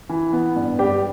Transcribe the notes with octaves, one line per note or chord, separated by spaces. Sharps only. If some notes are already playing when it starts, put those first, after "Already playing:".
E3
B3
G2
G3 G4